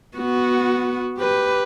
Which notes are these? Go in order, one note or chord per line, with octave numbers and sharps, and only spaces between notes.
B3 F#4
G4 B4